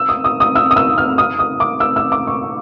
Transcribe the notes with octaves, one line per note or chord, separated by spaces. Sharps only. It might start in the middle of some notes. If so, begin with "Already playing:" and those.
Already playing: E6
D#6
D#6
D#6
E6
D#6
E6
F6
D#6
D#6
D6
E6
E6
D6
C#6